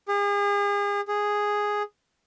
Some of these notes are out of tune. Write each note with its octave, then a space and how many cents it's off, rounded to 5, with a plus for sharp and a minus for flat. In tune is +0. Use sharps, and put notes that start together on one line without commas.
G#4 -40
G#4 -5